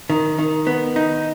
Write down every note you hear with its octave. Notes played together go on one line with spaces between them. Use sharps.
D#3
D#3
B3
D#4